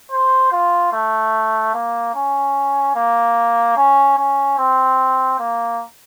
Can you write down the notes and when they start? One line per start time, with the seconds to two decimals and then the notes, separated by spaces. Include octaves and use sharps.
0.11 C5
0.52 F4
0.93 A3
1.74 A#3
2.15 C#4
2.96 A#3
3.77 C#4
4.18 C#4
4.58 C4
5.39 A#3